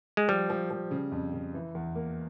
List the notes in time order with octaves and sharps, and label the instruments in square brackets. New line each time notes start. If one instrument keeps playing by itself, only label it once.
[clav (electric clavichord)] G#3
[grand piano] F3 [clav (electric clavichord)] G3
[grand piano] F3
F3
C#3
F2
C#3
E3
E2
A#3